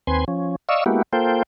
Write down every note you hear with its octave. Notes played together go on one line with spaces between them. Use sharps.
D#2 C4 B4 G#5 C6
F3 C#4
D5 D#5 F5 C#6 E6
G#3 A#3 B3 E4 F#4 G4
A#3 F4 A4 C5 G5